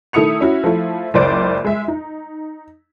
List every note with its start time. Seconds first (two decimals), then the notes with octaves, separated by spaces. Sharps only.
0.13 D#3 A3 E4 D#6 C#7 F7
0.41 C#4 E4 F#4
0.64 F3 A3 E4
1.14 F#1 C#2 C5 D5 D7
1.65 G#3 E5
1.88 D#4